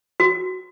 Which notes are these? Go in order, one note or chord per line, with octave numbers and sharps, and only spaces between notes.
F#4